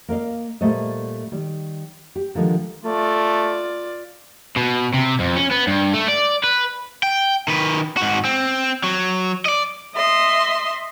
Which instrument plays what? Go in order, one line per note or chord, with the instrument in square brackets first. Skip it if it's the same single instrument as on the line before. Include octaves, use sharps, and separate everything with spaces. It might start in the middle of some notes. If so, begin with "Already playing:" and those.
[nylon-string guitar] A#3 A#4 D#5 F5
A#2 G3 A3 C5 D#5
D#3 G3
G4
D3 D#3 F3 G3 G#3
[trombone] A3 [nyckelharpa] F4 D5
[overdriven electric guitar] B2
C3
F2
C#4
B3
G2
A3
D5
B4
G5
D#3 B4
G#2 F#4
C4
F#3
D5 D#5
[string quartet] D#5 E5 C6